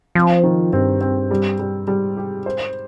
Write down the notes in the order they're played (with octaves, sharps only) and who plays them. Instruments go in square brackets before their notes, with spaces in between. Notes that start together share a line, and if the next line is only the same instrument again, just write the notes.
[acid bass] F3 [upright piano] C4
[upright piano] D#3
[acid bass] G2 [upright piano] C4
[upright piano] C4
G3
G3
[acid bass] G#2 [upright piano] G3
[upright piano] G4
C5